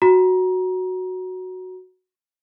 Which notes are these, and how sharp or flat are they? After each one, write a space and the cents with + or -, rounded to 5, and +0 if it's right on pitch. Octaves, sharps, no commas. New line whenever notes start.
F#4 +0 A#5 +25